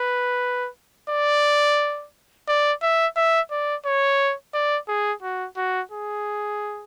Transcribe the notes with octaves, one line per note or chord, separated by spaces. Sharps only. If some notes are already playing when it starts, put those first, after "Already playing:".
Already playing: B4
D5
D5
E5
E5
D5
C#5
D5
G#4
F#4
F#4
G#4